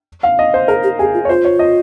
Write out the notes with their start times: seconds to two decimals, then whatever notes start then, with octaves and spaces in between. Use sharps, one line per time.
0.23 F5
0.39 D#5
0.54 C5
0.68 G#4 A#4
0.83 G4
0.99 G4 G#4
1.14 F4
1.25 C#5
1.29 F4 C5
1.45 C#5
1.59 D#5